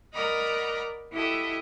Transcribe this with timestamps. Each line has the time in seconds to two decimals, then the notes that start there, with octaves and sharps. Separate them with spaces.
0.13 A#4 D5 D#5 F#5 A#5 B5
1.12 E4 F#4 G4 A4 D#5 E5